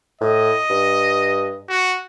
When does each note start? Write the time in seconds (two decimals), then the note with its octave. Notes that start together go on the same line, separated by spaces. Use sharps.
0.21 A2 D#5
0.70 G2
1.69 F#4